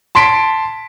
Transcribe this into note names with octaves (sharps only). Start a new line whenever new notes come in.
A5 C6 B6 D7